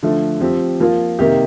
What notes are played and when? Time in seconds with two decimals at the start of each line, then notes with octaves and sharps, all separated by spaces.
0.03 D3 F3 A3
0.41 F3 C4 G4
0.80 F3 A#3 F4
1.19 C3 D#3 A#3 D#4 G4